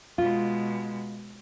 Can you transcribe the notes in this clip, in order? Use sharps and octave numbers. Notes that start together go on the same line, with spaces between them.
B2 G#3 F4